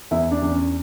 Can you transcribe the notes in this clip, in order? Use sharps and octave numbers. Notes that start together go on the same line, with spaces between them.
E2 E4
D4
E2 D4
C#4